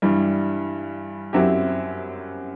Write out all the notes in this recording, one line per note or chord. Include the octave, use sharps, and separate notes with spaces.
G2 E3 G3
F#2 F#3 C4 E4 G4